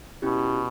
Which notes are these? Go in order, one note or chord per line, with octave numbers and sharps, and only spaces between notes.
B2 C#4 E4 G4